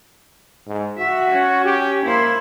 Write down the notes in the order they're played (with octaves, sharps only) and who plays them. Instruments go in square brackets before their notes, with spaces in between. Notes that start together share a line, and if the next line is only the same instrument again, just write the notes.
[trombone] G#2
[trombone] F#4 [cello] E5
[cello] C#4
[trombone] G4
[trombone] A#3 [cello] E4 C5